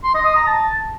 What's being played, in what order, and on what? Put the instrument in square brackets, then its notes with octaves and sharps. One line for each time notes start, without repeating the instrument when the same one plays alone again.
[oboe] C6
D#5
D#6
A#5
A5